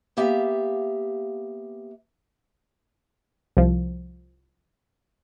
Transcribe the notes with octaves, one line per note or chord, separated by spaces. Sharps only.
A#3 B3 G4 E5 F5
C2 F3